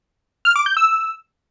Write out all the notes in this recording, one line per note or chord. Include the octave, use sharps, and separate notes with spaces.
F6
D6
G6
E6